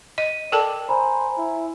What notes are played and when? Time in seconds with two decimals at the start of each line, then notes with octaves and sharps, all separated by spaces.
0.18 D#5 D#7
0.52 A4 A#4 D5 G5 A5
0.89 C5 G#5 A#5 B5
1.37 E4